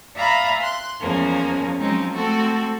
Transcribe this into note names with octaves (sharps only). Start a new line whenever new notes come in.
D5 E5 F5 G#5 A#5 B5
C6 F#6
E2 F3 G#3 A#3 C#4
F3 F#3 G#3 C4 C#4 D#4
G#3 A3 C4 F#4 A4